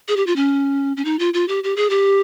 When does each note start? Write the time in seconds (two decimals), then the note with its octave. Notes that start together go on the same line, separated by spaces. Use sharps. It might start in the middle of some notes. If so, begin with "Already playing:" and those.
0.08 G#4
0.17 G4
0.27 F4
0.36 C#4
0.97 C#4
1.05 D#4
1.19 F4
1.34 F4
1.48 G4
1.64 G4
1.76 G#4
1.90 G4